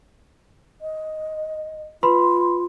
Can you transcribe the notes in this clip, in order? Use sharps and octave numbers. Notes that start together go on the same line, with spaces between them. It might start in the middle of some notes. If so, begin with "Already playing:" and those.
D#5
F4 B4 B5 C6